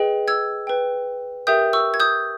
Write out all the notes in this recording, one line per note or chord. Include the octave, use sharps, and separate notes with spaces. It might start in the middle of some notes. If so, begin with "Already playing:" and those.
Already playing: G#4 B4 D#5 G5
E6 G#6
B4 G5
G4 A#4 E5 G5 D#6 G6
C#6 E6
G#6
D#6 G6